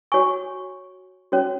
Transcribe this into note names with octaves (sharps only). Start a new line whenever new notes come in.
F#4 C#5 G#5 C#6
C#4 F#4 C#5